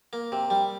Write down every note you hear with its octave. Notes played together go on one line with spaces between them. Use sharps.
A#3
C3
G3